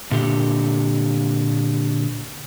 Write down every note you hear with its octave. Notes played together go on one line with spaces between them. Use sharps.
A#2 D3 G4